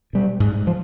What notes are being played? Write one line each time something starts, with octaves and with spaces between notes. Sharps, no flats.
B2 G3
G#2
F3